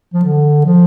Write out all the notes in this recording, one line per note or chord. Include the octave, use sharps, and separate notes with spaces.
F3
D3
F3